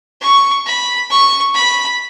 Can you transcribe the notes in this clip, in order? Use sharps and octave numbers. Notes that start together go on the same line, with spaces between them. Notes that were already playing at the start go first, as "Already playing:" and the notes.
C#6
B5
C#6
B5